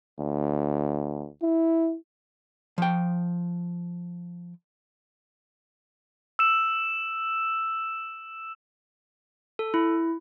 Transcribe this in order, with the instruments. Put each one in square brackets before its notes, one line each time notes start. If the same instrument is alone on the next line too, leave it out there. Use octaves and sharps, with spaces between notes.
[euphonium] D2
E4
[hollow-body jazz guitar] F3 G5
[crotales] E6 E7
[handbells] A4
E4